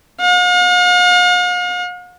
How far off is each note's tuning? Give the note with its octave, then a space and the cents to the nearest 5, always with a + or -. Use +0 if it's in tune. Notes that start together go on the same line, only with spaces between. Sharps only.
F5 +45